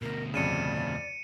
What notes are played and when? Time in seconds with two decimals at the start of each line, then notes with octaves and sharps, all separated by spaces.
0.02 D2 B2 A#4
0.34 F2 C#3 D5 C#7 D#7 E7